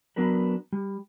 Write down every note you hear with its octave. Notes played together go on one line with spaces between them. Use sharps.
F#3 B3 D4 A#4 B4
G3